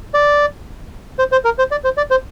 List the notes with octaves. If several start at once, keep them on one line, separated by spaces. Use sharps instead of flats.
D5
C5
C5
A#4
C5
D5
C5
D5
C5